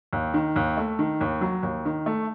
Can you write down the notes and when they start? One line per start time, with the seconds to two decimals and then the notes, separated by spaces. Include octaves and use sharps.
0.13 D#2
0.34 D#3
0.56 D#2
0.77 A3
0.99 D#3
1.21 D#2
1.41 F#3
1.63 D#2
1.85 D#3
2.06 A3